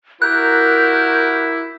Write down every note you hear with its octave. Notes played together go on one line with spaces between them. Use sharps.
E4 F#4 G4 A#4 F#6 G6